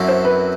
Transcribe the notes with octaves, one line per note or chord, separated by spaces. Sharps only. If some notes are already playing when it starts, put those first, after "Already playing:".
Already playing: F#2 F#3 C4 E4 A4
C5
B4